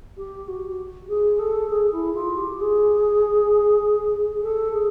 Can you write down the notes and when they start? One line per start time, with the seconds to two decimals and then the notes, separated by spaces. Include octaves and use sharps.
0.17 G4
0.48 F#4
1.08 G#4
1.39 A4
1.69 G#4
1.92 E4
2.14 F4
2.37 G4
2.60 G#4
4.42 A4
4.73 G#4